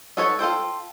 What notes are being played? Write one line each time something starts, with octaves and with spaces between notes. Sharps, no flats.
D#4 F#4 A4 B4 C#5
F4 A4 C5 G5